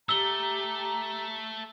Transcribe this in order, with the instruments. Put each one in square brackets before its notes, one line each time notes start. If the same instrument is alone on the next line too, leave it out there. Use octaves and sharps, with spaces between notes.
[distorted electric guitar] A3 [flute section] G4 A#5 [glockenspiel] E6 G7